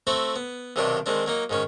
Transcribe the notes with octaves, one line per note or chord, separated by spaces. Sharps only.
A3 C4 F#4 C5 E5
B3
B1 C3 D#3 F#3 D4 G4
D#3 G#3 C4 D4
F#3 A#3 D#4
G#2 D#3 C#4